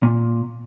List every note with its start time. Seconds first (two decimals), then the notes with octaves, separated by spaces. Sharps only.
0.03 A#2